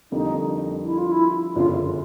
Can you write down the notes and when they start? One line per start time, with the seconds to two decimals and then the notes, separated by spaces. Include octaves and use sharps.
0.12 F2 D3 G3 A#3 D#4
0.84 E4
0.97 F4
1.11 E4
1.55 G1 F#2 C#3 F4